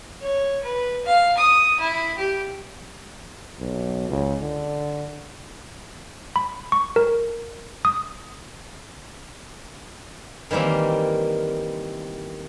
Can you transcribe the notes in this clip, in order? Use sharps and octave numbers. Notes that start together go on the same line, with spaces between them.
C#5
B4
F5
D#6
E4
G4
B1
C#2
D3
B5
C#6
A#4
D#6
D#3 E3 G3 A#3 C4